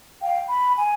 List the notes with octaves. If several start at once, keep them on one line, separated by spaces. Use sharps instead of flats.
F5 G5
B5
G#5